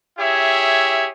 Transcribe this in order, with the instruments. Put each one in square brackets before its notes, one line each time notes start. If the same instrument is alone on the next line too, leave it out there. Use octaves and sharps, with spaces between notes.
[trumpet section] E4 G4 G#4 C#5 E5